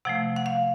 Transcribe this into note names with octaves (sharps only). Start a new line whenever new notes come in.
C3 F3 A3 F#5
F#5
F5